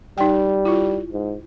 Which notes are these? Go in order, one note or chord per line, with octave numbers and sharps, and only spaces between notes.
G3 D#4 G5
E4 F4
G#2